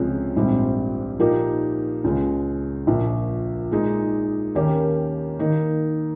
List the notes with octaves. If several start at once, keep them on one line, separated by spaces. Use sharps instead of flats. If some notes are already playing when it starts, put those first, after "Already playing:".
Already playing: C#2 C3 F3 G#3 C#4
A#1 G#2 G3 C4
A#2 F3 A#3 D#4 G4
C#2 C#3 G#3
A#1 A#2 F3
A#2 G#3 D#4 G#4
D#2 D#3 A#3 C#4 G4
D#3 A#3 D#4